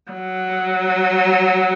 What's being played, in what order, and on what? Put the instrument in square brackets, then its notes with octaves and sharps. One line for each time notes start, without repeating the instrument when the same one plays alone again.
[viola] F#3